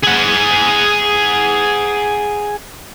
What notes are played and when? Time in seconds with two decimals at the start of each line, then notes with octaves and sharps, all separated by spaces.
0.04 G#4 F#5